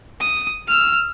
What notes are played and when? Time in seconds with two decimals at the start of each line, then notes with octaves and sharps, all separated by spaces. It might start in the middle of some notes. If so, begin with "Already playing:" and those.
0.20 D#6
0.67 E6 F6